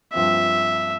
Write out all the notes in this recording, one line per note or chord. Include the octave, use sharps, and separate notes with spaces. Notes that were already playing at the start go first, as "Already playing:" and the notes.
G2 F3 C4 E5